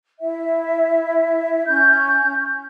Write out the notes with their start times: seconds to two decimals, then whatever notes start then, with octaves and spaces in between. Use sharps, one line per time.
0.20 E4 E5
1.66 C#4 G6